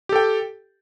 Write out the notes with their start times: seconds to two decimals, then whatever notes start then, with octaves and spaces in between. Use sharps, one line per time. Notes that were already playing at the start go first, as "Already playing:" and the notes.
0.09 G4
0.12 A4
0.16 G5